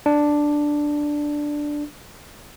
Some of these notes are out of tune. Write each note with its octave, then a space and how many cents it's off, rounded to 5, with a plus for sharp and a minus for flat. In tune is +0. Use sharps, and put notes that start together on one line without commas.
D4 +0